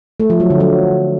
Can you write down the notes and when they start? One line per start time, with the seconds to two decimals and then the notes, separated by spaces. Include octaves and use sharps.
0.20 A3
0.30 F3
0.40 F#3
0.50 D3
0.60 F#3